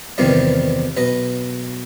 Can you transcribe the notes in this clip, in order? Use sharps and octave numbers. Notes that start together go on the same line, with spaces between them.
E2 G2 C3 D#3 F3 G3
B1 B4 D#5